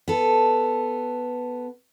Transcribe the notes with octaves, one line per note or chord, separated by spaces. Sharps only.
B3 A4